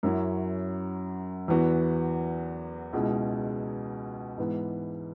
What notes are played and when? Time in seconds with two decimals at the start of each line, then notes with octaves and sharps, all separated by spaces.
0.03 F#2 F#3 C#4 E4
1.48 E2 E3 B3 F#4
2.93 C#2 B2 G#3 E4
4.38 G#2 E3 B3